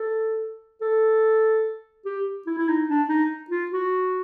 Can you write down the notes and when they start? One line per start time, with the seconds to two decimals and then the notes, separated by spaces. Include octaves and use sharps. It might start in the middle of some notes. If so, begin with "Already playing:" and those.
Already playing: A4
0.81 A4
2.05 G4
2.46 E4
2.58 E4
2.68 D#4
2.89 D4
3.09 D#4
3.50 F4
3.71 F#4